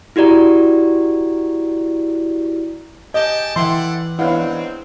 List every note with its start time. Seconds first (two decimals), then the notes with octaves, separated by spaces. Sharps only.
0.16 E4 F#4 G4 D5 A#5
3.14 G4 D#5 G#5 A5 G6 G7
3.56 E3 E4 A4 D5 E5 F#5 G5 C6
4.19 G#2 B3 C4 D4 E4 C#5 F5 F#5